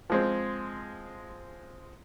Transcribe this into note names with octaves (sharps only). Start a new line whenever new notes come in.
F3 G#3 C4